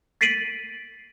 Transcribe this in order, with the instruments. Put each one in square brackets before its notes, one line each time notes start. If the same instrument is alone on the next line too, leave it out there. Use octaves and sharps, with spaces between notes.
[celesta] A6 B6 C7 D7 D#7 F#7